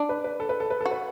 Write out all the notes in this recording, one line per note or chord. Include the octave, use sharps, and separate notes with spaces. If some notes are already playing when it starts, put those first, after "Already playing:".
Already playing: D4
B4
B4
A4
B4
A4
B4
F#4 A4
B4